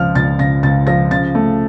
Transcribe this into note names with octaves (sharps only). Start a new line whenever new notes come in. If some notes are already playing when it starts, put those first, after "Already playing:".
Already playing: C#2 F3 F6
C#2 A6
C#3 A#6
C#2 A6
F3 A#6
C#3 A6
A3